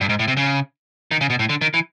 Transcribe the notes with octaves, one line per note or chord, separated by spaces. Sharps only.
G2
G#2
A2
C3
C#3
D#3
C#3
B2
A2
D3
D#3
E3